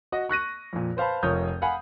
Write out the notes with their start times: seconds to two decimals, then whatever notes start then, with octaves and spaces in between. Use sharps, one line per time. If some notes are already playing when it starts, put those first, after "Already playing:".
0.12 F#4 D#5
0.29 C#6 F#6 A#6 D#7
0.73 F2 A#2
0.97 B4 C5 F5 A5 B5
1.23 F1 F4 A#4 C#5 D#6 G6
1.62 F5 F#5 G#5 B5